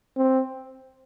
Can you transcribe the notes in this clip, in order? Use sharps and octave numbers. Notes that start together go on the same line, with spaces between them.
C4